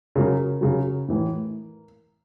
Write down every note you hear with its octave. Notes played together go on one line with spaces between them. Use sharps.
C#3 F#3 A#4
C#3 F#3
A2 E3